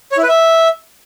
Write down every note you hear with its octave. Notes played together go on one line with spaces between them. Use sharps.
C#5
E4
B4
E5